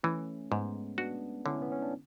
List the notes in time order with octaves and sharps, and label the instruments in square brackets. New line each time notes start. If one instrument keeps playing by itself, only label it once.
[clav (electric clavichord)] E3 [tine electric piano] A3 C#4
[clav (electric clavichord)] G#2 [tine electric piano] G#3 B3
[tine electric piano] B3 D4 [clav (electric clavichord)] F#4
[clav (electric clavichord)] D3 [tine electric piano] C#4 E4
[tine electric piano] B3
C#4
D4